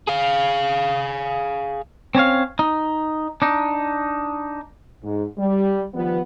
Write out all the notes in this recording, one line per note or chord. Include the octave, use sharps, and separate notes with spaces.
G#4 F5
C4 C#4 C#5 F5
D#4
D4 D#4
G#2
G3
D#3 F3 G3 B3